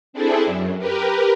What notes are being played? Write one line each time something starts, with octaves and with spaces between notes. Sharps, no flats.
C4 D4 E4 G#4 A4
F#2
G4 A#4 B4